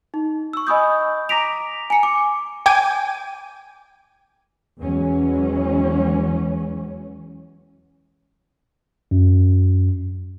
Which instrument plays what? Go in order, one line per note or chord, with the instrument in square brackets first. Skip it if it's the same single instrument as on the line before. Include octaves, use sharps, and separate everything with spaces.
[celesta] D#4
C#6 E6
D#5 G#5 B5 C#6 D#6 G6
A#5 D6 A#6 B6 D7 F7
G#5 A#5 C#7
D6
[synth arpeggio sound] G5 G#5 D6 D#7
[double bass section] E2 E3 F#3 G#3 C#4
[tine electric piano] F#2